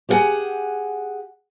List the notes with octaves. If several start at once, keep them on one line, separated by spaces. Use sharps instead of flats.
G4 G#4 B4 E5 F#5 G#5